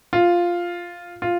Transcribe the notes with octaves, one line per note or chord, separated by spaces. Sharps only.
F4
F4